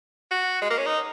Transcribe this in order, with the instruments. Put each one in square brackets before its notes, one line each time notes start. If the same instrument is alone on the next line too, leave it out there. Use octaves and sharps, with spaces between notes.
[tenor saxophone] F#4
G#3
A#3
C#4
D#4